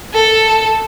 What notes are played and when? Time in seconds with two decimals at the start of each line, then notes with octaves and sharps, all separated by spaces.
0.14 A4